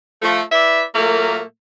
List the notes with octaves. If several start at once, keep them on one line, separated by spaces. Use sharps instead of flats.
F3 A3
E4 B4 D5 E5
A#2 F#3 A3 A#3